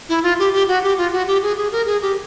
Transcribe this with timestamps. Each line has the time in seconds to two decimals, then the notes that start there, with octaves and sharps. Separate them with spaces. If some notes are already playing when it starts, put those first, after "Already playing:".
0.09 E4
0.23 F4
0.39 G4
0.53 G4
0.68 F#4
0.83 G4
0.97 F4
1.12 F#4
1.27 G4
1.43 G#4
1.57 G#4
1.72 A#4
1.87 G#4
2.02 G4